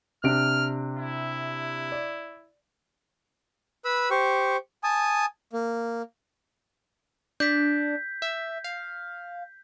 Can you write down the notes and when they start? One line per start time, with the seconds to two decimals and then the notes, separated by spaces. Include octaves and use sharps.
0.24 C3 D4 F6 D7
0.96 E4
1.92 D5
3.85 B4 B5 E6
4.11 G4 C5 C#6
4.83 G#5 A5 D#6
5.53 A#3
7.40 D4 G6 B6
8.22 E5
8.64 F5